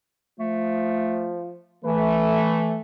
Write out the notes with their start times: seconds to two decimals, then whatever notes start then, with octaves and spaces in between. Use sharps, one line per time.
0.39 F3 A3
1.85 E3 A3 B4